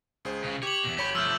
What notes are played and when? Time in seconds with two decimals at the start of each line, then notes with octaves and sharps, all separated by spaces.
0.25 C#2 G#4 C5
0.44 C#3
0.63 G4 C#5 D6 F#7
0.84 E2 B2
0.98 G1 G4 C#5 B5
1.15 F3 A3 E6 F6 G6